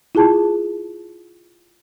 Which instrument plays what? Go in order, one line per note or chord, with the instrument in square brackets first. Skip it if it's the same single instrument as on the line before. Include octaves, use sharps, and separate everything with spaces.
[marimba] E4 F4 G#4 A5